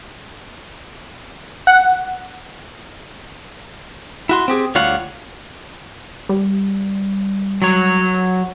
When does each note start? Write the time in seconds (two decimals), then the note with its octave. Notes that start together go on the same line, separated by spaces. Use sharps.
1.67 F#5
4.29 E4 F#4 C6
4.48 C4 G4 G#4
4.75 D2 G3 F4 C#5 F5 F#5
6.29 G3
7.62 F#3 C#5